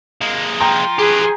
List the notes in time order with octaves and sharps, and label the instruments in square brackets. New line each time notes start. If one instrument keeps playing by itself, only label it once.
[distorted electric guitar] G#3 A#3
[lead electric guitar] F3 [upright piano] G5 A#5
[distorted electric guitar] G4 B4 [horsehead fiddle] G#4